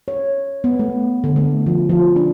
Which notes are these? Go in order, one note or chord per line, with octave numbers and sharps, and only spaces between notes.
C#5
B3
A3
D3
A3
F3
F3
D4